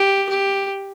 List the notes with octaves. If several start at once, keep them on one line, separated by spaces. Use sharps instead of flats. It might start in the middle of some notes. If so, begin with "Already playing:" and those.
Already playing: G4
G4